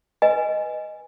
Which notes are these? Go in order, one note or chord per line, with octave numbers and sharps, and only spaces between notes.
B4 D#5 G#5